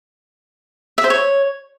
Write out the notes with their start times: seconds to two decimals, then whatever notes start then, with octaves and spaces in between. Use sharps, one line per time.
0.98 E5
1.04 C5
1.10 C#5